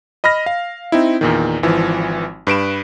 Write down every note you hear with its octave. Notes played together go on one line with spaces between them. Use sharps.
D#5 B5 F6 A#6
F5
C4 D#4 E4
E2 A#2 D#3
G#1 E3 F3
G2 B4 D7 E7